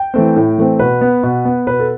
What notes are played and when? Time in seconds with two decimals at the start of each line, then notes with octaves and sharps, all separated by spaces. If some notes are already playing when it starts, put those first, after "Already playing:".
Already playing: G5
0.14 E3 A3 C4
0.36 A2
0.58 E3 A3 C4
0.79 B2 B4
1.01 B3
1.23 B2
1.45 B3
1.67 B2 B4
1.80 A4